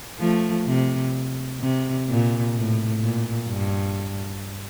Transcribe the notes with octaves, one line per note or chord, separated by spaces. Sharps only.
F3 A3
C3
C3
A#2
A2
A#2
G2